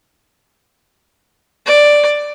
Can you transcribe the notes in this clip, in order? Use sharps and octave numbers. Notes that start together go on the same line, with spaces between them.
D5